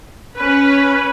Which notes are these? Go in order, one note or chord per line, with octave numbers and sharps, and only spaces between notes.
C#4 B4